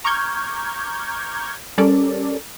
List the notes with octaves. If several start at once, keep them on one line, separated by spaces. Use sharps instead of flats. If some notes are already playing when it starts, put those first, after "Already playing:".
A#5 C#6 D6 F6 G6 G#6
G3 C#4 A4 A#4 D5